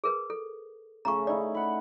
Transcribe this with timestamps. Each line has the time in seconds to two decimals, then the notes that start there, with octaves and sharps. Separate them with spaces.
0.04 G#4 A#4 B4
0.30 A4
1.05 C#3 A3 C#4 A#5 C#6
1.27 D#4 E4 D5
1.55 F#5 B5